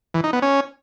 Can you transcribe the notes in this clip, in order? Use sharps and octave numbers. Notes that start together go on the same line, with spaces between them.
E3
D#4
B3
C#4